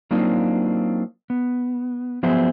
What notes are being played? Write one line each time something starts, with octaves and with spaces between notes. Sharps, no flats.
F#3 A#3 C4 D4 D#4 F4
B3
F3 F#3 B3 G#4 C5 E5